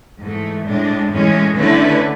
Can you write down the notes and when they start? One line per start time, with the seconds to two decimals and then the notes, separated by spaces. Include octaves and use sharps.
0.19 G#2 E3 A3
0.65 A2 G#3 D4
1.10 A2 E3 G#3 C#4
1.56 D3 A3 C#4 E4 B4